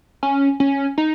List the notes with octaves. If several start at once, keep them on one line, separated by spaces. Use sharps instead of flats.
C#4
C#4
D#4